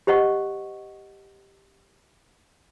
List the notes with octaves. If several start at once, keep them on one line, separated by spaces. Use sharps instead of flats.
G4 C5 D#5 F#5 C#6